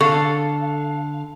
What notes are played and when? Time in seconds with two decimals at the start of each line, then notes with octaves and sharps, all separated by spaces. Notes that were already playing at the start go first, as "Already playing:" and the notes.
0.01 D3 A4 F5 C#6